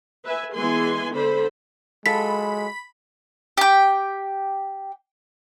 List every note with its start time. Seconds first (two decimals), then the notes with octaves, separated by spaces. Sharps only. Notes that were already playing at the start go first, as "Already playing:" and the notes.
0.24 B4 E5 G#5
0.55 E3 G#3 B3 G#4 G#5 C6
1.13 D3 A4 C5 B5
2.06 F#3 G#3 F4 A4 B5 B6
3.57 G4 G5